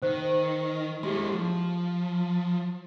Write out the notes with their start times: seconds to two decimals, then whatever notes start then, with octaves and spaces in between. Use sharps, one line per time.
0.02 D#3 C5
1.03 G#3 E4 G4 C6
1.32 F3